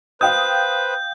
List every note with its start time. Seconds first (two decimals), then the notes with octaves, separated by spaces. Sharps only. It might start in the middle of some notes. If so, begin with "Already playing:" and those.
0.21 B4 C5 F5 G5 D#6 G6